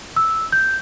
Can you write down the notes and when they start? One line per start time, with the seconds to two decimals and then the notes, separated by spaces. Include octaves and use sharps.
0.16 E6
0.52 G6